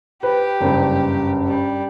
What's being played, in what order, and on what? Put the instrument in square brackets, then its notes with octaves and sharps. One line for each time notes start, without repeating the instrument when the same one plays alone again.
[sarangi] G4 [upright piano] B4
[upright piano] F#1 G2
[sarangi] G3